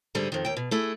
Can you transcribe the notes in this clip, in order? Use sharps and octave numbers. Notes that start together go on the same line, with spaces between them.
G#2 D3 G3 G#4
F2 D#3
D#2 G5
B2
A3 E4 G#4